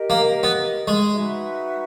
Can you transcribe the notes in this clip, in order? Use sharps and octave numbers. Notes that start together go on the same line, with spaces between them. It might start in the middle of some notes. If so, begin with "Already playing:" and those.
Already playing: G4 A#4 D#5
A#3
B3
G#3
D#4 F#4 B4 E5